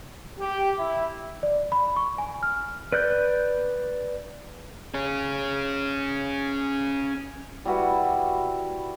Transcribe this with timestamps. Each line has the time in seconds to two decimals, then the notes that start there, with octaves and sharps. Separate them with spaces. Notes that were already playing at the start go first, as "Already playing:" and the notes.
0.39 G4
0.77 E4
1.43 D5
1.72 B5
1.96 C#6
2.18 G#5
2.43 F6
2.92 B4 D5 F#6 G6
4.94 C#4 G#4
7.65 G3 E4 F#4 B4